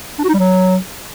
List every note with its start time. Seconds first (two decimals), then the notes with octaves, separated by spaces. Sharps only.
0.19 D4
0.24 F#4
0.29 D#4
0.34 G3
0.39 F#3